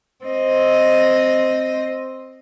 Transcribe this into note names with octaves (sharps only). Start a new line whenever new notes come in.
C4 D#5